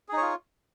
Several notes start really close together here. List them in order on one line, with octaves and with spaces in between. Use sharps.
G#4 D#4 C#5 F4